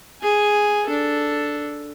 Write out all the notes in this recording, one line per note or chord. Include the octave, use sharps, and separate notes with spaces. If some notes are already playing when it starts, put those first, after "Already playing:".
G#4 G#5
D4 A4